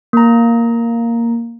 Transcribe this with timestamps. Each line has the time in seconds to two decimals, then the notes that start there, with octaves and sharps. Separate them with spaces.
0.13 A#3 A#5